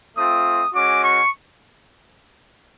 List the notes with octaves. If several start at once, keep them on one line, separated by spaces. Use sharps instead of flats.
A3 C4 F4 D#6
G#3 C#4 F#4 D6
C#6